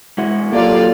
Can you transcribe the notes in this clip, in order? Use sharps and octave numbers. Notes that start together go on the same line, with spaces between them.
G#3 E4 F#4
F#3 A#3 F4 G4 A4 D5 F5